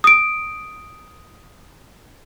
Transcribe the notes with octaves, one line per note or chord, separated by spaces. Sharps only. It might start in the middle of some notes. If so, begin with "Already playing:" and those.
D#6 D7